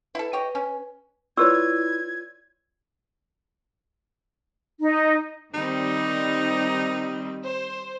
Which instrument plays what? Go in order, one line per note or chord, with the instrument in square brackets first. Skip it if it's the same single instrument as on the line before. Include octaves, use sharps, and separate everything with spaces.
[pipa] E4 A4 [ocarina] B4
[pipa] G4 C#5 D#5
C#4
[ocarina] E4 [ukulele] F4 B4 C#5 [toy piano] D5 C#6 E6 [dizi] G#6
[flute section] D#4
[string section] D#3 G3 C4 [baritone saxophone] D#4
[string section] C5